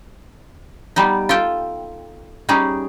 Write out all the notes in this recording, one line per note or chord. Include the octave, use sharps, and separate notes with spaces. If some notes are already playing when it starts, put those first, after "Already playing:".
G3 B3 D#4
F4 A4 G5
G3 C#4 D#4 G#4